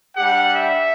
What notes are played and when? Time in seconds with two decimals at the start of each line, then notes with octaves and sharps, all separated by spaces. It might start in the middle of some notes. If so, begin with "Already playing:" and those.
0.16 G3 D4 G4 F#5
0.55 E5